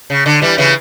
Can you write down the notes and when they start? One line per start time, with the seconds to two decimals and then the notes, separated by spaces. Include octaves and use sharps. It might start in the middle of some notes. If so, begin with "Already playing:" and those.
0.10 C#3
0.26 D3
0.41 E3 G3
0.58 C#3 E3